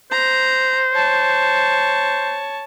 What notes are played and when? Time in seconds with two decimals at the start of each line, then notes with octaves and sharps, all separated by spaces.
0.12 C5 A#5
0.94 C#5 A5